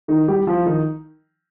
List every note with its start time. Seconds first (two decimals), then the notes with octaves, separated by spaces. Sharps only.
0.08 D#3 D#4
0.28 G3 G4
0.47 F3 F4
0.66 D#3 D#4